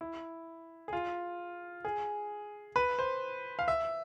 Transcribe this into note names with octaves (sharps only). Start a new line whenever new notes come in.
E4
G#4
F4
G#4
B4
C5
F5
E5